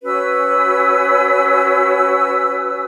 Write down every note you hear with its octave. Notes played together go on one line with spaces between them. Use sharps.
C#4 F#4 B4 E6